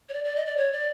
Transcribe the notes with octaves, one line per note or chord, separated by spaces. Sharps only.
C#5
D5
D5
D#5
D5
C#5
D5